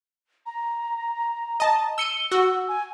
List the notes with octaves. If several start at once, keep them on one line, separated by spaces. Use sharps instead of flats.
A#5
D#5 A5
E6 C#7 D#7 G7
F#4 E6
G#5